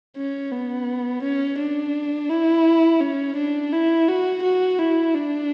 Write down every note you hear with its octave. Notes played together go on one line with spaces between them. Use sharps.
C#4
B3
C#4
D4
E4
C#4
D4
E4
F#4
F#4
E4
D4